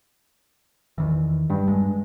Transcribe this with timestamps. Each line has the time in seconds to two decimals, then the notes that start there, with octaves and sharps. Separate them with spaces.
0.98 E2 D#3 E3
1.50 G2
1.68 G#3